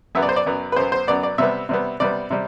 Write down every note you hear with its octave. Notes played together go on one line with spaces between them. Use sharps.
F#2 F#3 B3 E5
D5
C5
D5
F#2 F#3 B3
B4
F#2 F#3 B3 C5
C5
F#2 F#3 B3 D5
D5
C3 G3 B3 E5
C3 G3 B3
C3 G3 B3 D5
C3 G3